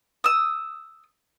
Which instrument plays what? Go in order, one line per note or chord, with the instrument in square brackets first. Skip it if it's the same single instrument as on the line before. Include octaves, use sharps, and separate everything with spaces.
[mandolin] D#6 E6